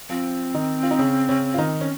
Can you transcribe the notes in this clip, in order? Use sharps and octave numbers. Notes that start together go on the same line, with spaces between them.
F3 C4 F4
D#3 D#4
F4
D#4
C#3 C#4
C#3 C#4
F4
D#3 D#4
C#4